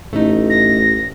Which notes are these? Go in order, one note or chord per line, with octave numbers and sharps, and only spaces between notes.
A1 A3 D#4
A#6